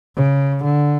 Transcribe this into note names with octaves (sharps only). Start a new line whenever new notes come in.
C#3
D3